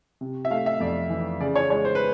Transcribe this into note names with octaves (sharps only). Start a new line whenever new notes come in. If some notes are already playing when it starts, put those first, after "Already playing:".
C3
E5
A3 F5
E5
F2 D5
E3
C#3 D5
C#5
G#3 C#5
C5
B4